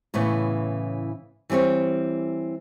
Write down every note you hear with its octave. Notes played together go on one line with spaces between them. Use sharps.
A2 C#3 E3 B3
E3 G3 C4 G4 C#5